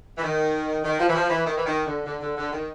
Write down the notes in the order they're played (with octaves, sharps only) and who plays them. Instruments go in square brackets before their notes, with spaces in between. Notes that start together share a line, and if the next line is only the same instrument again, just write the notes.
[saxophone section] E3
D#3
D#3
F3
E3
F3
E3
D#3
E3
D#3
D3
D3
D3
D3
D#3